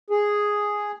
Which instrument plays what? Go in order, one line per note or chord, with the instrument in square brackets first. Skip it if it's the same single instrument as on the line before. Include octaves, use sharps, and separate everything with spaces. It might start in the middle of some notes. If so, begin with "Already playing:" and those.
[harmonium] G#4